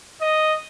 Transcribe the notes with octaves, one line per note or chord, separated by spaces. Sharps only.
D#5